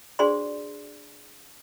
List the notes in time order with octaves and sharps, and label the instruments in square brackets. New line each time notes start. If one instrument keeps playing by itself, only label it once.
[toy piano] D4 F#4 G#4 C5 D5 C6